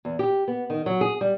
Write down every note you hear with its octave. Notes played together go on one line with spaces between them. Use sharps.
E2
G4
B3
D#3
F#3
G#4
G3